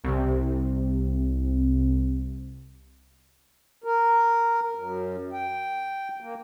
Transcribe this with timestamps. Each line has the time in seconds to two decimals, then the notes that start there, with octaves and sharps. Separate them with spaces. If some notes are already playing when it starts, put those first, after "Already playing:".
0.04 C2 C3
3.84 A#4
4.75 F#2
5.33 G5
6.20 A#3